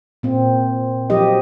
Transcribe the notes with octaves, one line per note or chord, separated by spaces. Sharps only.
A#2 C4
F3 F#3 G4 D#5